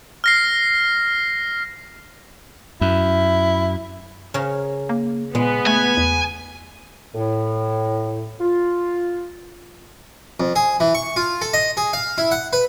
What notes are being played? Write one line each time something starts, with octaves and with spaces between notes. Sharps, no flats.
F6 A#6 C7
F#2 E4
C#3 C#4 A#4
A#3
A#2 G#3 B3
A3 G#5
E2
A2
F4
F2
G#4
E3
C#6
F4
A4
D#5
G#4
F5
E4
F#5
B4